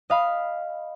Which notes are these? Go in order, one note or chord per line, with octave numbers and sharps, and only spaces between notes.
D#5 F5 B5